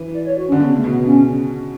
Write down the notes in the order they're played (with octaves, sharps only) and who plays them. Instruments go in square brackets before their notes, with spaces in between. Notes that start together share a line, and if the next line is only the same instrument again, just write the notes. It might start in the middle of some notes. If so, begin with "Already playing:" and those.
Already playing: [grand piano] E3
[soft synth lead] D5
C#5
F#4
C#4
[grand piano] D3
[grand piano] C#3 [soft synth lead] B3
[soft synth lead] A3
[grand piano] B2
[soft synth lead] B3
[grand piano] C#3 [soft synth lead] C#4